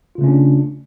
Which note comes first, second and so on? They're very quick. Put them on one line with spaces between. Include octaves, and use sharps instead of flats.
F4 C#3 A3 C#4 D4